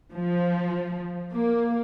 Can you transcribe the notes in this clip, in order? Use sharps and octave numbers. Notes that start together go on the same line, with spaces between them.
F3
A#3